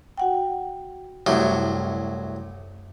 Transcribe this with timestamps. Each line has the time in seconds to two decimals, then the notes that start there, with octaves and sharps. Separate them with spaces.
0.18 F#4 F#5 G5
1.27 C2 F#2 A2 F#3